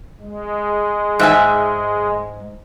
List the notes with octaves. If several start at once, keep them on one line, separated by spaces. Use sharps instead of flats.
G#3
G#2 E5 G#5